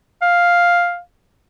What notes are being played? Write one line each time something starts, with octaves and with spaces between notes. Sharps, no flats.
F5